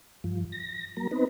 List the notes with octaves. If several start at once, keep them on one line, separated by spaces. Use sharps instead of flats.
G2 F3
A#6
F#3 A#3 A#5
B3 C4 D#4 B4